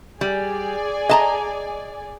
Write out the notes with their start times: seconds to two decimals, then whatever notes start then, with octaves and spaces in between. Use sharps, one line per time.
0.21 G3 G#4 D5 G#5
1.09 D#5 A5 A#5